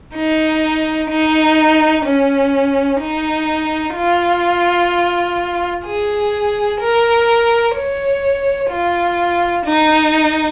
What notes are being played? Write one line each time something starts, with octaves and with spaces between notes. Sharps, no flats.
D#4
D#4
C#4
D#4
F4
G#4
A#4
C#5
F4
D#4